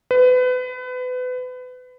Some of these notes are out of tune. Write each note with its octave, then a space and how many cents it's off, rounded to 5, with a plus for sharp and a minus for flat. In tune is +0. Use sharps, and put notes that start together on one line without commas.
B4 +30